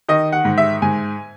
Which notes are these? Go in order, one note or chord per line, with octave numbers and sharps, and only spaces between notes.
D#3 D#5
F#5
G#2
E5
G#2 G#5